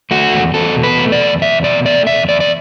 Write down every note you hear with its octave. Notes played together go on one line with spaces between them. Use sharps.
A3 F#4
E2
E2 A4
B2
B4
A3
D5
E2
E2 E5
B2 D5
A3 D5
E2 E5
E2 D5
D5